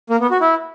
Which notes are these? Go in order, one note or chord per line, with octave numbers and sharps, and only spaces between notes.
A#3
B3
F#4
E4